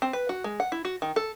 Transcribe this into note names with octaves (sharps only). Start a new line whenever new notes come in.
C4
B4
F#4
G#3
F#5
E4
F#4
D#3
A4